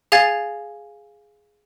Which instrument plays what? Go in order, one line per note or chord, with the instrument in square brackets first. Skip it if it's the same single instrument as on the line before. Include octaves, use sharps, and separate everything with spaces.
[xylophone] G#4 F5 G#5 G#6 A6